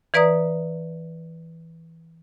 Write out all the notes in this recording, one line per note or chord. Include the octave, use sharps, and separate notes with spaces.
E3 B4 D5 A#5 D#6